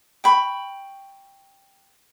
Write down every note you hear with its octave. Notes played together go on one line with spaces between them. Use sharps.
G5 B5 C#6